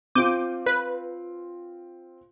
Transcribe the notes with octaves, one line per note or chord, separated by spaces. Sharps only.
C4 F4 D6 G6 D#7
B4